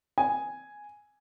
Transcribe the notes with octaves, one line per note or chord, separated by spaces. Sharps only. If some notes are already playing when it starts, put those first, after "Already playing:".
G#5